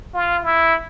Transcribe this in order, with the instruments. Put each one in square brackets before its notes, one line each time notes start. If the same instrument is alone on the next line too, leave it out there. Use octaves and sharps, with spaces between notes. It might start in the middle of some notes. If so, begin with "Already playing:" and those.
[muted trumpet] F4
E4